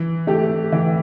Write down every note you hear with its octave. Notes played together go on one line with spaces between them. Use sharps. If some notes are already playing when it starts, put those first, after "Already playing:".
Already playing: E3
A3 G4
E3